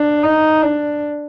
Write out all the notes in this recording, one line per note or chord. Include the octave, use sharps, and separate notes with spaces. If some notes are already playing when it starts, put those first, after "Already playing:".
Already playing: D4
D#4
D4